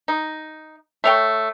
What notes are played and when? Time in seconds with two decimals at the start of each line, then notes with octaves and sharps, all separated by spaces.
0.08 D#4
1.04 A3 C#5 G5